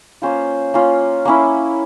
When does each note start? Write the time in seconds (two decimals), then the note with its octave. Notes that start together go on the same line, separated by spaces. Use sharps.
0.22 A#3 C#4 F4 C5
0.74 A#3 C#4 F4
1.25 A#3 C#4 E4